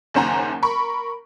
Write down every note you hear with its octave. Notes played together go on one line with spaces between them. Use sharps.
F#1 D#2 C#4 C5 F#5 A#5
A#4 B5 C#6